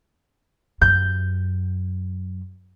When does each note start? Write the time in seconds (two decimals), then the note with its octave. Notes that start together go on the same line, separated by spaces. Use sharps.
0.81 F#2 G6